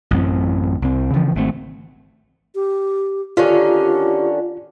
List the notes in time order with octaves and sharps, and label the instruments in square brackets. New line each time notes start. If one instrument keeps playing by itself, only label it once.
[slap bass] A1 F#2 C4
C2 C4
C#3 E3 F3
G#1 A3 C4
[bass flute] G4
[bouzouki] D3 D#3 C#4 [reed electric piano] F4 [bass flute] G4